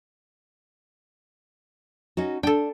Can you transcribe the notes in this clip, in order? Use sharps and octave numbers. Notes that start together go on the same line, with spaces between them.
C#4 D#4 F#4
D4 A4 G5